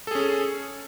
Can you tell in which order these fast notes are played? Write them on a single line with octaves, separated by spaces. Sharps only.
A4 G#4 C#4